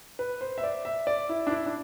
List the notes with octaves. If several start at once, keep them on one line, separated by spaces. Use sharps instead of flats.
B4
C5
E5
D5
E5
D5
E4
D4
E4
D4